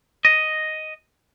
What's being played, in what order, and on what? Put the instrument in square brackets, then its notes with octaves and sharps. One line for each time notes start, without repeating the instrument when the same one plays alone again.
[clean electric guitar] D#5